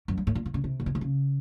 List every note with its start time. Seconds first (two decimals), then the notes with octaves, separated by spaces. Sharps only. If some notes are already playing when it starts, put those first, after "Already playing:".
0.08 F#2
0.18 G2
0.27 A2
0.35 A#2
0.46 B2
0.54 C#3
0.64 C3
0.80 A#2
0.86 B2
0.95 C3
1.01 C#3